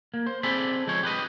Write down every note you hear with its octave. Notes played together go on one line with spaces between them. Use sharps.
A#3
C5
C4 G#4 A4 D5 B5
F3 G#3 C5 C#5
G4 B4 D#5